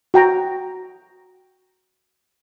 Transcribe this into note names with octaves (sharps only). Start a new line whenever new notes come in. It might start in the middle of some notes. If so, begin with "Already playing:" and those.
F#4 G5 A#5